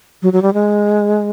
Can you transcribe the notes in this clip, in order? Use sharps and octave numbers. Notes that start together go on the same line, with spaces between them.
F#3
F#3
G3
G#3